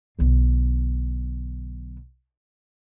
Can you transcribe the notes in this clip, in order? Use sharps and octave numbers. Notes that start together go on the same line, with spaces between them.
B1 D3